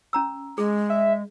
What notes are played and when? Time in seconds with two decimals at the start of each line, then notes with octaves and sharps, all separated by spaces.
0.13 C#4 A#5 E6
0.58 G#3 G#4
0.90 E5